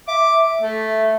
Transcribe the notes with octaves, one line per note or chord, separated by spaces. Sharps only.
E5 D6
A3